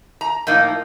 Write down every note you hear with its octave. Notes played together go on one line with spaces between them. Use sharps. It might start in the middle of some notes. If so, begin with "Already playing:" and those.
A#5
A2 F3 A#3 D#4